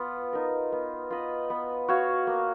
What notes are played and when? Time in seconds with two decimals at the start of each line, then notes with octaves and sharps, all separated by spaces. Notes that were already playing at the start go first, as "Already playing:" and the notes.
Already playing: B3 F4
0.33 D#4 A#4
0.72 B3
1.10 F4 B4 D#5
1.50 B3
1.88 F#4 C#5 F5
2.27 A#3